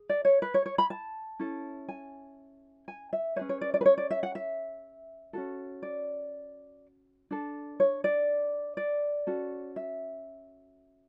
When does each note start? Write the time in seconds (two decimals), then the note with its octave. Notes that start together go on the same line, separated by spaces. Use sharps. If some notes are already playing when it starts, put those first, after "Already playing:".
Already playing: G#4
0.09 D5
0.25 C#5
0.42 B4
0.54 C#5
0.66 C#5
0.78 B5
0.90 A5
1.39 C#4 E4 A4
1.89 G#5
2.88 G#5
3.13 E5
3.36 B4 C#5
3.39 C#4 G#4
3.49 C#5
3.61 D5
3.74 D5
3.81 B4
3.86 C#5
3.98 D5
4.11 E5
4.23 F#5
4.35 E5
5.33 C#4 F#4 A4
5.83 D5
7.31 D4 A4
7.80 C#5
8.04 D5
8.77 D5
9.27 C#4 F#4 A4
9.76 E5